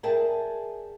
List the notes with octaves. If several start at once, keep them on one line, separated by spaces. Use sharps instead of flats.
G#4 A#4 D5 E5 G5 A5